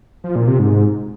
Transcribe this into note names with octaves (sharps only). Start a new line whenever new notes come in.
F3
A#2
C3
G#2